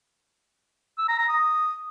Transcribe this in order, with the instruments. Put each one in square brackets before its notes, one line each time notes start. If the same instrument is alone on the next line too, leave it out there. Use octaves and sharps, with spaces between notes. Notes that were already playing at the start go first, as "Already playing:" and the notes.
[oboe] E6
A#5
A#5
D#6